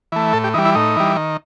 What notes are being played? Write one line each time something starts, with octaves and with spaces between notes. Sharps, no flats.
E3 A3
A2 A4
G4
E3 G3 D#4
E4
A2 D#4
E3 G3
D#3